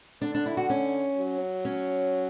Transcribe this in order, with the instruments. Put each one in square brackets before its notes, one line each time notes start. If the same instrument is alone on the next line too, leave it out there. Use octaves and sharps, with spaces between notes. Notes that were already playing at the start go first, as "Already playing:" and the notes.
[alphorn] D3 [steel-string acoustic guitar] D4
[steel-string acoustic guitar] D4
E4
F#4
C#4
[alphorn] F#3
[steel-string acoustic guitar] C#4